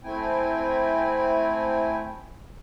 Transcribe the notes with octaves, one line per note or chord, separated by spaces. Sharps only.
A3 C4 E4 G5 G#5